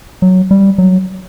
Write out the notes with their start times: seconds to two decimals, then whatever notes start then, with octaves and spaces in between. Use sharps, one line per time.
0.22 F#3
0.51 G3
0.78 F#3